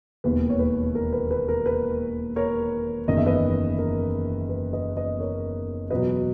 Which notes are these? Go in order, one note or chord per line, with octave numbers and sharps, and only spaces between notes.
E1 D#2 D#3 B4
C#5
B4
A#4
B4
B4
A#4
B4
A#4 C#5
F#1 E2 D#3 D#5
E5
B4 D#5
A#4
B4
B4 D#5
B4 D#5
A#4 C#5
E2 B2 F#3 B4 D#5